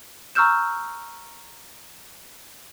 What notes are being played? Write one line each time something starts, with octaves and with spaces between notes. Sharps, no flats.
A#5 C#6 E6 F6 G6 E7